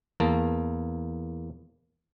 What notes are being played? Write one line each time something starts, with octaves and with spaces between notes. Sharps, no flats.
E2 A#3 A5